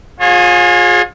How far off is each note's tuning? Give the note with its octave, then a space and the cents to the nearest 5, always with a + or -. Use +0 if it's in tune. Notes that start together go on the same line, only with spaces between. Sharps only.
F4 +35 G#4 +0 C#5 -25